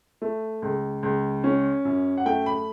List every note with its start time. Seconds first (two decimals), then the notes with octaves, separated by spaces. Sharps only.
0.22 A3
0.62 C#2
1.03 C#2
1.44 C#4
1.85 F#2
2.17 F#5
2.26 A3 G5
2.46 B5